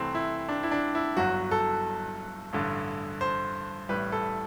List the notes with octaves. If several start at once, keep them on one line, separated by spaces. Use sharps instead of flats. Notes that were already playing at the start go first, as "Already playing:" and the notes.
Already playing: C2 C3 E3 A3 C4
E4
D4
E4
D4
E4
G1 G2 F#3 F#4
A4
A1 G2 D3
C5
A1 A2 G3 B4
A4